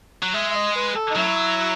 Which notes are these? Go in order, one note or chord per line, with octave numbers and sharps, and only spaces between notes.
F#3
G#3 E5
E5
D#5
B4
A4
D#4
F#3 A3 C#4 E4